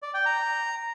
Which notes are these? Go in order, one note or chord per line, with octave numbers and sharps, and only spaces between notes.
D5
G5
A#5